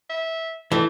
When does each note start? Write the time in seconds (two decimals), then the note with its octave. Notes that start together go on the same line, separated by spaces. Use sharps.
0.09 E5
0.72 E3 A3 D4